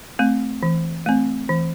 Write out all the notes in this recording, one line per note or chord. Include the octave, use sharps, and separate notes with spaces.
A3 C4
E3
A3 C4
E3